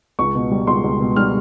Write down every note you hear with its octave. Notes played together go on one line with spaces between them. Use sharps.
C#2 C#6
B2
G3
C#2 C6
C#2
B2
G3 F6